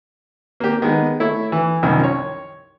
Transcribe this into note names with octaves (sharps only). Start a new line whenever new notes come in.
A#3 G4
D#3 G#3 B3
A3 E4 C#5
E3
C2 F#2 D#3 F3
C#5